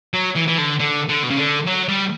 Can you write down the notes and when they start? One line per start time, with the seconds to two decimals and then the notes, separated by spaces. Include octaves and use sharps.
0.14 F#3
0.35 E3
0.48 E3
0.58 D3
0.80 D3
1.09 D3
1.23 B2
1.30 C#3
1.37 D3
1.67 F#3
1.88 G3